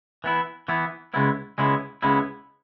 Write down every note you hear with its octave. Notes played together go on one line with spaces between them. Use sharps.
E3 B3 E4
E3 B3 E4
C#2 C#3 G#3 B3 E4
C#2 C#3 G#3 B3 E4
C#2 C#3 G#3 B3 E4